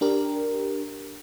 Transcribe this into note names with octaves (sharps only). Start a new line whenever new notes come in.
D4 G4 A#4